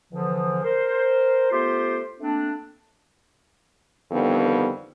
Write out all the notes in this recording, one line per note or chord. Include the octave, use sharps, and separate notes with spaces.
E2 D3 E3 F3
A#4 C5
A3 B3 F4 G4 C5 C6
A3 A#3 C4 D4
F2 D3 D#3 G3 B3